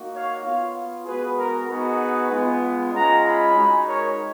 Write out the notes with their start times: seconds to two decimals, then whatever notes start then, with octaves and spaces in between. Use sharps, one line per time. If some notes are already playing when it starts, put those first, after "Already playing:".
Already playing: A#3 D#4 F#4
0.12 C#5 F5
0.43 B3 F4 C#5 F5
1.05 G#3 B3 F#4 G#4 B4
1.37 A#4
1.68 B3 D#4 F#4 G#4 B4
2.30 G#3 B3 F4
2.91 G#3 C#4 F4 F#5 A#5
3.23 G#5 B5
3.54 G#3 D#4 F#4
3.85 A#4 C#5